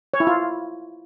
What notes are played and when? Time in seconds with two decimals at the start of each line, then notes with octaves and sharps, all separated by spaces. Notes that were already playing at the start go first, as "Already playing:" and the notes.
0.14 C#5
0.20 E4
0.27 F4